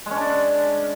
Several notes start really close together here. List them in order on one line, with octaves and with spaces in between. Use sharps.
G#3 C#4 D4 D5